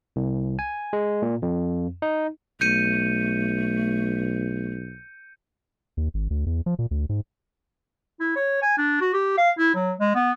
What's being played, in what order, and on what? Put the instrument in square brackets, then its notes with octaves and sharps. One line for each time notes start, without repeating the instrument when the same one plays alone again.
[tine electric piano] C2
G#5
G#3
A#2
F2
D#4
[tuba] B1 [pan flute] A3 [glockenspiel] G6 C#7 D#7
[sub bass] D#2
G#1
D2
E2
F3
A#2
D2
G#2
[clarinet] E4
C#5
G#5
D4
F#4
G4
F5
E4
F#3
G#3
B3